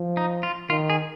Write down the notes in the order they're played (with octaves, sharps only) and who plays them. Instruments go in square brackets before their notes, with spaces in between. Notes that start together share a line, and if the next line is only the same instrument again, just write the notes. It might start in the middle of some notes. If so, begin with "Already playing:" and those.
Already playing: [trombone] F3
[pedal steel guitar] D#4
F4
[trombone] D#3 [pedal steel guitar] F4
[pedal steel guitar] G#4